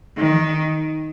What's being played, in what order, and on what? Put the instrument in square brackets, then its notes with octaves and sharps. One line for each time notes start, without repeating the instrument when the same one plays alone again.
[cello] D#3